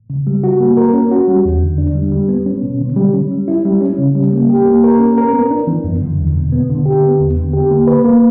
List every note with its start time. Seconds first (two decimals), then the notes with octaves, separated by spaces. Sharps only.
0.10 C#3
0.27 G3
0.44 F#4
0.60 A#3
0.77 A#4
0.94 C#4
1.12 F#4
1.28 G3
1.45 E2
1.62 D3
1.78 D4
1.95 G3
2.12 G3
2.29 B3
2.46 C#4
2.63 B2
2.81 D3
2.96 G3
3.14 C#4
3.31 G3
3.48 E4
3.65 G3
3.81 C#4
3.99 C#3
4.15 G3
4.33 A#3
4.50 G4
4.66 A#3
4.84 A#4
5.00 C#4
5.18 A#4
5.33 B3
5.51 D4
5.67 E3
5.84 F#2
6.02 D3
6.18 E2
6.36 B2
6.52 B3
6.70 D3
6.86 G4
7.03 B3
7.19 E2
7.37 D3
7.53 G4
7.71 A#3
7.87 B4
8.05 A#3